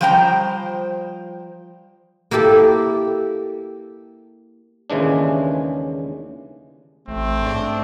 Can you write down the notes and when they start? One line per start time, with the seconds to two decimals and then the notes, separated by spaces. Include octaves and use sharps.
0.01 F3 G3 C5 G5 A#5
2.31 A#3 E4 G4 A4
4.90 D#2 C#3 E3 G#3 D4
7.08 A1 A3 C4
7.42 G#2 G#3 D4